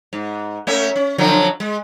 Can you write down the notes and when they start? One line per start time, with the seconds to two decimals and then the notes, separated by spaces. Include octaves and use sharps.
0.13 G#2
0.67 A3 C#4 E5
0.96 C#4
1.18 D3 F3 F#3
1.60 G#3